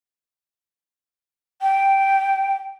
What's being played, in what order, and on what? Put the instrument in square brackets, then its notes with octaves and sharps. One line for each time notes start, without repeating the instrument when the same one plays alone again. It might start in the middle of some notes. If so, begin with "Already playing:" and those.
[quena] G5